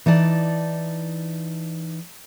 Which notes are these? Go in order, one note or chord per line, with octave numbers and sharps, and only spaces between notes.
E3 D#4 D5 A5